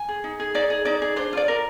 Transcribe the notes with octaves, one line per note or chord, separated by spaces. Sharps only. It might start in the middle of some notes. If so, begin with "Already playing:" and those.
Already playing: G#5
G#4
D#4
G#4
D#4 D5
G#4
D#4 D5
G#4
D4 C5
F4 D5
A#4